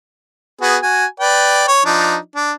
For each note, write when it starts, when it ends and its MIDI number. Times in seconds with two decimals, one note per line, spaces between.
0.61 0.78 59
0.61 0.78 66
0.61 0.78 68
0.83 1.06 66
0.83 1.06 80
1.20 1.67 71
1.20 1.67 74
1.20 1.67 79
1.68 1.83 73
1.85 2.17 53
1.85 2.17 62
1.85 2.17 63
2.36 2.52 62